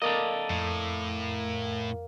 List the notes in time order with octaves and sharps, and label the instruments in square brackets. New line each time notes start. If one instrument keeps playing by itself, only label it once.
[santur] A#3 [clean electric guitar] A4 D5 D#5
[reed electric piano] F2 [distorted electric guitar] A2